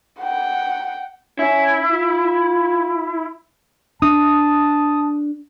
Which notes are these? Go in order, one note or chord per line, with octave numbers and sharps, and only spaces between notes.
F#5 G5
C#4 E4
F4
D4 A5 D#6